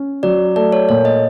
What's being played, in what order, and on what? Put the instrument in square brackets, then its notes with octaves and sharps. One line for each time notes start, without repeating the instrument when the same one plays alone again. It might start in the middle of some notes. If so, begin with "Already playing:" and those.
Already playing: [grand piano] C#4
[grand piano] F#3 [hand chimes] D5
[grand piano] A3 [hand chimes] D5
[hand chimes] C#5
[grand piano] A#2 [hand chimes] C#5
[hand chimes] D#5